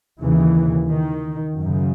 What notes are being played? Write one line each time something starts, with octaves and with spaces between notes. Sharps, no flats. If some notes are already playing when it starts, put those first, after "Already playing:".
D#2 C#3 E3
D#3
F#2 C#3